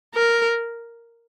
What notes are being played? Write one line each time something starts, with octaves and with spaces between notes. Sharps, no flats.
A#4